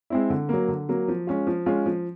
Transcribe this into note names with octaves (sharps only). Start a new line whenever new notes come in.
G#3 C4 E4
D3
F#3 A#3
D3
F#3 A#3
F3
G#3 C#4 F4
F3
G#3 C#4 F4
F3